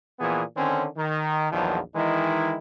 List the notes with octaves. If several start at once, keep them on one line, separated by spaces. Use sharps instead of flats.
A#2 E3 F3 B3 G#4
D3 D#3 C4 C#4
D#3
A#1 E2 D#3 F3 F#3
D#3 E3 G#3 D#4 E4